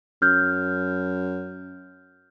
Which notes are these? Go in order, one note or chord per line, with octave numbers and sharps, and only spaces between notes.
F#2 F6 G6